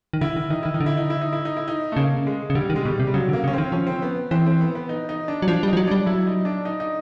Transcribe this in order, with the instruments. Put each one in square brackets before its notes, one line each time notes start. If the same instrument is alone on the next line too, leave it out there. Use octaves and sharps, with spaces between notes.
[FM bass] D#3
[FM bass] D3 [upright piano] E4
[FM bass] D#3
[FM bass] D#3 [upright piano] D#4
[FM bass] D#3 [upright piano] E4
[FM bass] D#3 [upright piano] D#4
[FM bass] D3
[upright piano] E4
D#4
E4
D#4
E4
D#4
E4
D#4
A3
[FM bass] C#3 [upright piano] A#3
[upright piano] G#3
[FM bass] C#3
[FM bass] D3 [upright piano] G3
[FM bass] D#3
[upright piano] G#3
[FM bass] B2 [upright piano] G3
[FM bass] C3
[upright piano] G3
[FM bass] C#3 [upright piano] F#3
[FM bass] D3
[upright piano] A#3
[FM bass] C#3
[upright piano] C#4
[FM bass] D#3 [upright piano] C4
[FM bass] F3 [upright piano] C#4
[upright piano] C4
B3
[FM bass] E3 [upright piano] C4
[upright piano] C4
B3
B3
D#4
D#4
D4
[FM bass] F#3
[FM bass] F3 [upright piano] D4
[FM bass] G3
[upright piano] D#4
[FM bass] F3
F#3
[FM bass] G3 [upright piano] D4
[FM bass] F#3 [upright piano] E4
[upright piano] D#4
D4
D#4
D#4